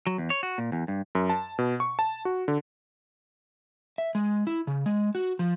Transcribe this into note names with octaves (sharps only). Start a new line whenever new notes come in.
F#3
E2
C#5
F#4
A#2
E2
G2
F#2
A5
B2
C#6
A5
F#4
D3
E5
G#3
E4
C#3
G#3
F#4
F3